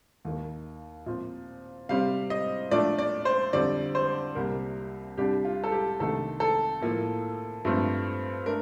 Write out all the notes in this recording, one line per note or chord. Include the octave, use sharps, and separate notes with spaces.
D#2 D#3 A#3
A#2 F3 C4
C3 G3 C4 F5
D#5
A#2 F3 A3 D4 D5
D5
C5
F2 D3 G3 C4 D5
C5
C2 C3 G3 A#3 A#4
C2 C3 G3 D4 G4
F4
A4
G4
C2 C3 D#3 A3 D4 A4
A4
A2 F3 A#3
G2 F3 A3 C4
A3 D4 A#4